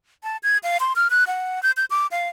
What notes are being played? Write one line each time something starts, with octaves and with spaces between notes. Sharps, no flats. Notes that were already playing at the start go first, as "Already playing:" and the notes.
A5
G#6
F5
C6
F6
F#6
F#5
G6
G6
D6
F5